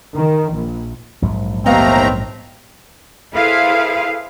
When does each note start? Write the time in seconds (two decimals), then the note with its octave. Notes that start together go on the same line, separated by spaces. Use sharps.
0.15 D#3
0.53 A#1
1.22 A#1 G#2 F#3
1.66 D#2 A3 B3 C4 D#5 F5 A#5
3.34 E4 G#4 A4 B4 C5 F5